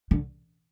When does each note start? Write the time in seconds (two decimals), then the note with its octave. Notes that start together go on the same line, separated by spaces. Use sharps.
0.11 D3